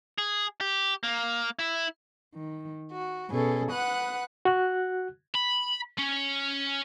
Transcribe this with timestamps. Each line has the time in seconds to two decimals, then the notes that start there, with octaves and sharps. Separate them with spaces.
0.18 G#4
0.61 G4
1.03 A#3
1.59 E4
2.35 D#3
2.91 F#4
3.30 B2 C#4 G#4 A4
3.71 B4 F#5 D#6 F#6
4.45 F#4 F#6
5.35 B5
5.99 C#4